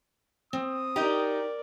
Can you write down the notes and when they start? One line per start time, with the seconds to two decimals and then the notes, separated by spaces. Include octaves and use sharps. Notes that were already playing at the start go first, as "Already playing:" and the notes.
0.53 C4 D#6
0.96 D#4 G4 A#4 D5 A#5